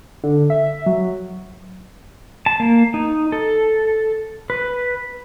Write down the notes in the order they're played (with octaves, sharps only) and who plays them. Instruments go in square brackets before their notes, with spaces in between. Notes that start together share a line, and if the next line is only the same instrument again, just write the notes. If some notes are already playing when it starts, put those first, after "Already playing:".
[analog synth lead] D3
E5
F#3
[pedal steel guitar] A5
A#3
D#4
A4
B4